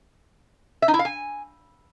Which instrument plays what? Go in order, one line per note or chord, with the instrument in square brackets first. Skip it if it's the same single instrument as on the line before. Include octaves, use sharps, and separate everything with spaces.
[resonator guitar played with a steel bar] E5
D#4
E4
F5
G#5